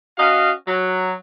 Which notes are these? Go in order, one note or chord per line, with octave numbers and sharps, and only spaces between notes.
C#4 F#4 D#5 F5
F#3